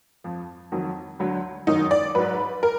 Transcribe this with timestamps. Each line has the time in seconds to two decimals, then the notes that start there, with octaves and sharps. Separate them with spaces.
0.24 F2 F3
0.72 F2 D#3 F#3
1.19 D2 D3 F#3
1.67 F#2 D#3 F#3 D#4
1.91 D5
2.15 G#2 F#3 B4
2.63 A#4